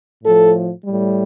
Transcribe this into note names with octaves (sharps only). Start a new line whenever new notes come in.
A2 F3 A4
A2 G3